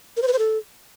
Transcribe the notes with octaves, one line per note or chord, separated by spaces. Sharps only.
A#4
C5
B4
C5
A4